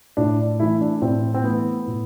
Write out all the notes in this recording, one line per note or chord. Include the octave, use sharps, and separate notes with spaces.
A2 D4
E3 A3 E4
D4
A2 C4
C4
E3 A3 B3
A2